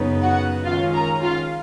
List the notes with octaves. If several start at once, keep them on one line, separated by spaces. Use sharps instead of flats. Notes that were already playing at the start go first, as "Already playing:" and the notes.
Already playing: F#2 C#3 F#3 B3 D#4
F#4 F#5
D#3 G#3 C#4 F4 F5
A#4 A#5
F4 F5